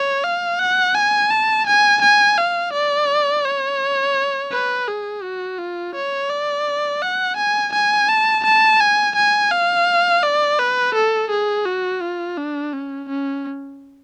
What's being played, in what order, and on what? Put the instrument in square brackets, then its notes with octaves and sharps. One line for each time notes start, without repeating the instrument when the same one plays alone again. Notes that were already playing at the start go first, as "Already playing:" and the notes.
Already playing: [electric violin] C#5
F5
F#5
G#5
A5
G#5
G#5
F5
D5
C#5
B4
G#4
F#4
F4
C#5
D5
F#5
G#5
G#5
A5
A5
G#5
G#5
F5
D5
B4
A4
G#4
F#4
F4
D4
C#4
C#4